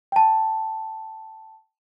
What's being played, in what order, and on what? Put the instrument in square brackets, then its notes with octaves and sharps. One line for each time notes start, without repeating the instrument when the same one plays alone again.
[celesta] G5 A5